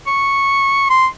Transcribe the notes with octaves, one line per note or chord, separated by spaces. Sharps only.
C#6
C6